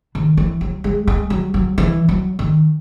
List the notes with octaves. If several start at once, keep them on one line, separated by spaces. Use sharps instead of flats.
D#3
E3
F#3
G#3
G#3
F#3
F#3
E3
F#3
D#3